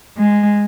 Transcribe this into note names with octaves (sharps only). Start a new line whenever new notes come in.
G#3